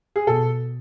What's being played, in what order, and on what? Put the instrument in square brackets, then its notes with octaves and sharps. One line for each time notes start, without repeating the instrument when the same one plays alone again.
[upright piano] G#4
[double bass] B2 [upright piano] A4